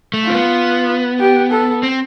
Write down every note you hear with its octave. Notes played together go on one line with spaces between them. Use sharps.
A3
F4
C4
B3
G4
A4
C4